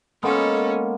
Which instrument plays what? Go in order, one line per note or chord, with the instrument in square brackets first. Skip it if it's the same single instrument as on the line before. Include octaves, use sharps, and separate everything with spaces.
[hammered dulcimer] G#3 A#3 B3 [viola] C#4 A4